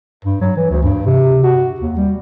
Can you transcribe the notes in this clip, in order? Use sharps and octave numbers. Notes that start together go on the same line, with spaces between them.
G2
F#3
E3
D2
G2
C3
F#4
D#2
G3